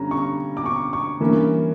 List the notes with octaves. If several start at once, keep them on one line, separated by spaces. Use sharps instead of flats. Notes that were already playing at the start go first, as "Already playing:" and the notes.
Already playing: G2 D3 G3 C#4 A#5
C#6
D6
C#6
C#6
G2 E3 A#3 C#4